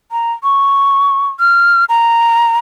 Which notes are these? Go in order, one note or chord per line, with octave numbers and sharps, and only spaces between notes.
A#5
C#6
F6
A#5